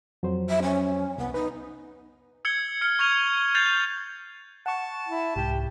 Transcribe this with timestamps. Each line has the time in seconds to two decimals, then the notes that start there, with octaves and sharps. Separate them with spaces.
0.23 F2 F#3 C5
0.49 E5
0.63 C#4
1.18 C2 B3
1.34 D#4 B4
2.45 E6 G#6 C#7 G7
2.81 F6 C#7
2.99 C#6 F6 G#6 F7 G7
3.55 G6 A6 C7 F7
4.66 F#5 A5 C#6
5.08 E4
5.36 C2 G#2 G4